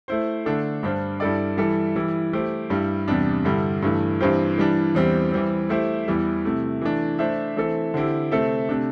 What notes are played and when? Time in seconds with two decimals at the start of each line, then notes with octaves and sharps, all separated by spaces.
0.08 A3 E4 C5
0.46 D3 A3 D4 A4
0.83 G2 G3 D4 C5
1.20 G2 G3 E4 A4 D5
1.57 E3 G3 E4 A4 E5
1.96 E3 G3 E4
2.33 A3 E4 G4 C5
2.70 G2 G3 E4
3.08 E2 C3 G3 D4
3.45 G2 D3 G3 E4
3.82 G2 E3 A3
4.20 G2 E3 C4 G4 C5
4.58 E3 G3 D4
4.95 E2 E3 G3 C4 G4
5.32 E3 G3 C4
5.69 A3 E4 G4 C5 E5
6.08 E2 E3 G3 E4
6.45 C3 A3 E4
6.81 E3 A3 D4
7.19 A3 D4 C5 E5
7.56 E3 A3 C4 A4 E5
7.94 D3 C4 E4 G4
8.31 C3 A3 C4 A4 E5
8.69 C3 A3 D4